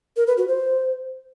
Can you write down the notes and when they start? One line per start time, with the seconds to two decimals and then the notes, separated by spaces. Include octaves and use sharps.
0.17 A#4
0.27 B4
0.37 F#4
0.48 C5